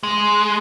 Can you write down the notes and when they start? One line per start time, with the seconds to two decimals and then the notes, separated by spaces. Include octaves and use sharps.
0.03 G#3